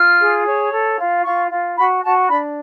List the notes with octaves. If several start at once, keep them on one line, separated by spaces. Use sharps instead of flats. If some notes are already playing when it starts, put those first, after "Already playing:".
Already playing: F4 F6
G#4
C#5
A4
F4
F4 C#6
F4
F#4 B5
F#4 A5
D4 B5